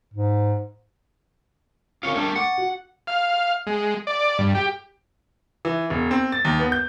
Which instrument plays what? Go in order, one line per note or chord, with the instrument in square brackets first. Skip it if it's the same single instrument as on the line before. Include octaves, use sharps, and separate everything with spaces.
[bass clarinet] G#2
[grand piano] C4 C#4 A#4 [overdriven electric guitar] F4 C#5
[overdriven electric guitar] G3 A3 [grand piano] D4 A#4 G#6
[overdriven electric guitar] F#5 [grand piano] C#6 D6 A6
[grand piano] F#4
[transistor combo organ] F5
G#3
D5
G2
G4
[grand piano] E3
E1
C4
A6
D#2
B3
G6